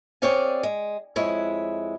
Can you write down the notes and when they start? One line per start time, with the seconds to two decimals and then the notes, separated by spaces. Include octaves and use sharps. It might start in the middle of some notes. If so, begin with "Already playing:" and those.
0.22 C4 G#4 C#5 D5 F5 G#5
0.63 G#3
1.16 F2 G#3 E4 C#5